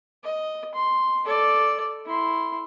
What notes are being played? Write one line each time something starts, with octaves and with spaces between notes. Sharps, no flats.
D#5
C6
A4 D5
E4 C6